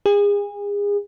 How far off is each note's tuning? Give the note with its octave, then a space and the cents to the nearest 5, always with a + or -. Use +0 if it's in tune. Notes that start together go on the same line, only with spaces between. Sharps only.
G#4 -35